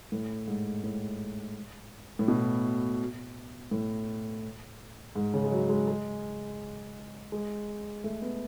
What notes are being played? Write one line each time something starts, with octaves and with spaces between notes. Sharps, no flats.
A2
G#2
A2
A2
B2
A2
G#2
C#3
G#3
F#3
G#3
G#3
G#3
A3
B3